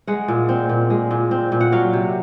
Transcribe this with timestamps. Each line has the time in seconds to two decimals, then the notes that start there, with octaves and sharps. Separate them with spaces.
0.07 G#3 F#5
0.28 A#2
0.49 C4
0.69 A#2
0.90 G#3
1.11 A#2
1.31 C4
1.52 A#2
1.61 F#5
1.72 F#3 F5
1.93 C3